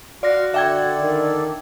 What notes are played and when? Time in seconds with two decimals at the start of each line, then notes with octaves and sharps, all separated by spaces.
0.23 F#4 D5 F5 C6 A#6
0.54 D3 A4 D5 E5 G5 G#6
1.01 D#3